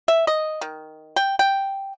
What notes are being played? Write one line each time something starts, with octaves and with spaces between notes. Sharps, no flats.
E5
D#5
D#3
G5
G5